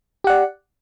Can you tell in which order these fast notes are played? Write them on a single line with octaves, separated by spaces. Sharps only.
G4 F#5 D5